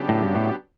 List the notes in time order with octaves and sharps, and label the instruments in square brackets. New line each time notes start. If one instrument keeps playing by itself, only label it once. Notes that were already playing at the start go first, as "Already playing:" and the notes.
Already playing: [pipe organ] C#3 F#3 B3 D4 G4
[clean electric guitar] A2
G2
A2